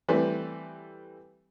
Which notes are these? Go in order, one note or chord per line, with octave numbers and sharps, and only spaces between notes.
E3 G3 A3 C4